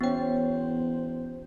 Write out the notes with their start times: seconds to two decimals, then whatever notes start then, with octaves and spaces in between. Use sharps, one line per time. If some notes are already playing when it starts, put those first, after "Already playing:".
0.01 E2 B3 C#4 F#4 C5 G5